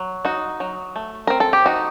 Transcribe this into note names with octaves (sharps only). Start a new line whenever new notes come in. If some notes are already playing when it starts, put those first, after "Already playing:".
Already playing: F#3
D#4 F#4
F#3
A3
C4 A#4
A4
G4
D#4 F#4